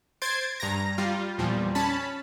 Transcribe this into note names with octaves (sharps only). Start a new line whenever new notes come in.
C5 G#6 A6 C7 D7
G2 A#5 A#6
G3 F4
E2 A#2 F3 G3
C#4 A5 B5